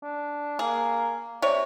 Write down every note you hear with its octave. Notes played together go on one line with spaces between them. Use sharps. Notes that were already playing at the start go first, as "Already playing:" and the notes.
D4
A#3 G#4
C3 C#5 D5